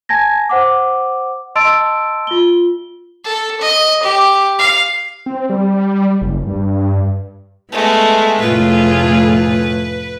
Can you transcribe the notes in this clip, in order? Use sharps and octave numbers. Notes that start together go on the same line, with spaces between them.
G#5 A5 G#6 A#6
C5 F#5 D6
D#5 A5 C6 E6 A6 D7
F4 G7
A4
D#5
G4
F5
C4
G3
F#1
G2
G#3 A3 B3
F1 A2 A3 F4 G#4 B4